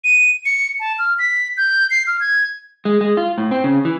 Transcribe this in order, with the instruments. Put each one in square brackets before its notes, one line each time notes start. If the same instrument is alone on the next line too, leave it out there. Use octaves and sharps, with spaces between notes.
[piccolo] D#7
C#7
A5
F6
B6
G6
C7
F6
G#6
[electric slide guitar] G#3
G#3
F4
A2
C4
C#3
E3